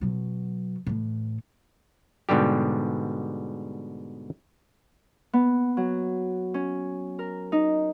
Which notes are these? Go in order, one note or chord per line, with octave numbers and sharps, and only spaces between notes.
B2 F#3
A2 E3
G#2 B2 D3 G3 G4
B3
F#3
C#4
A#4
D#4